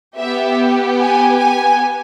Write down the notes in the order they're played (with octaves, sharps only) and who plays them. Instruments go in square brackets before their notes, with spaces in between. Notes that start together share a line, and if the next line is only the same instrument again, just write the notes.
[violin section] B3 G4 E5
G#5
G#5